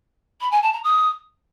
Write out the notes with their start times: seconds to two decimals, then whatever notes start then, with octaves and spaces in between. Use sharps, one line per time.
0.40 B5
0.51 G#5
0.62 A5
0.73 A#5
0.83 D#6